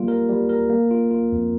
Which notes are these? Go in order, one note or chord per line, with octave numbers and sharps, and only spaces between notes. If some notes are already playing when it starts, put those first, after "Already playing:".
Already playing: G3 A#3 F4
A#4
G3
A#4
A#3
F4
F4
F2